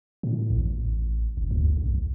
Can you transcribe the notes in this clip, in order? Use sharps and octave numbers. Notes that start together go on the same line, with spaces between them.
A2
A1
F#1
D2
B1